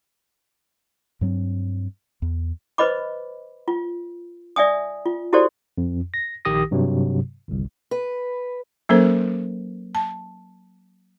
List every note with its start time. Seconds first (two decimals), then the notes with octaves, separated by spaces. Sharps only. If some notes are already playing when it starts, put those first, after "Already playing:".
1.21 G2 F#3 C4
2.22 E2
2.78 B4 C5 D#5 B5 D6
3.68 F4
4.56 D5 E5 G#5 D#6
5.06 F4
5.33 E4 F#4 G4 A4 C5 D5
5.78 F2
6.14 A#6
6.45 A#1 D#3 G4 D#6 A#6
6.71 G2 C3 F#3
7.48 G1 C2
7.91 B4
8.89 F#3 A#3 C#4 A4 A#4 C5
9.95 A5